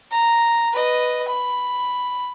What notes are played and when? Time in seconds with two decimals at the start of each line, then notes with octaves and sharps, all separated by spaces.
0.11 A#5
0.73 B4 D#5
1.28 B5